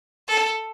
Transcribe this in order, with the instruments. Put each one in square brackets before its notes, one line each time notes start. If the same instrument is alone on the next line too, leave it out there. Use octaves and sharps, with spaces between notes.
[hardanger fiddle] A4